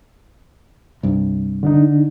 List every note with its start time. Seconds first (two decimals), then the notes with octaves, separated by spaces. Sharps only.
1.03 C2 G2
1.63 D3 D4 D#4